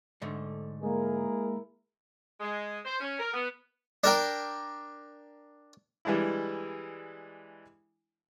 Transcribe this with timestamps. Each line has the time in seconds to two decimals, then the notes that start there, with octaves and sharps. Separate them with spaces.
0.22 G#2 D3 A3
0.83 G#3 A#3 E4 G#4 A#4
2.40 G#3
2.85 C5
3.00 C#4
3.20 A#4
3.34 B3
4.04 D4 A#4 G5
6.05 E3 G3 G#3 D4 E4